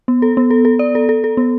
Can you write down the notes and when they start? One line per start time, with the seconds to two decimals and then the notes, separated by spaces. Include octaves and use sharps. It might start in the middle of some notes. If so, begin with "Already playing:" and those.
0.08 B3
0.22 A4
0.37 B3
0.51 A4
0.65 A4
0.79 D5
0.95 A4
1.09 A4
1.24 A4
1.37 B3